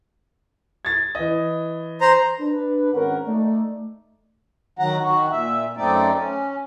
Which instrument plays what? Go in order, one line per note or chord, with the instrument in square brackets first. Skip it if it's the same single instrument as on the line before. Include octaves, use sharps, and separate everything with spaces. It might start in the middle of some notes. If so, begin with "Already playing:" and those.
[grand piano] G#6 A6
E3 D#5
[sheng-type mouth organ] C5 A#5
[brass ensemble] D4 B4
G#1 C#4 A#4 F#5
A3 D#4 D5
[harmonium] D#3 F#3 F#5 A#5
D#3 F#4
A#2 E5
F#2 A3 C4 D#4 D5
C#4